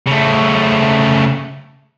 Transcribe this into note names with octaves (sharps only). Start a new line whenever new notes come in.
C#3 A3